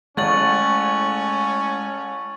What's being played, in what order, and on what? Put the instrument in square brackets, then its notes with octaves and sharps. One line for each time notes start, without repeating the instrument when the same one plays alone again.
[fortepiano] A1 [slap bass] G#3 A3 [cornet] C#4 [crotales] C#6 A6 F#7